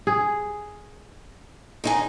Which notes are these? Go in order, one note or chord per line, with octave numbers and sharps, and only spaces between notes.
G#4
D#2 D#4 G#4